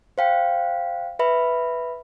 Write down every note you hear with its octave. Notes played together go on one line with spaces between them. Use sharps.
C5 F5 G5
B4 E5 B5